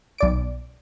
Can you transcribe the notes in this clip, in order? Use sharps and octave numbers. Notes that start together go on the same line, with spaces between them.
B1 D5 D7